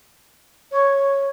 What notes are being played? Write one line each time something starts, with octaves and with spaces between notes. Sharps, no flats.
C#5